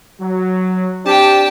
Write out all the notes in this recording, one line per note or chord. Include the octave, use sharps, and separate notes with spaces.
F#3
C4 D4 G4 G5 A5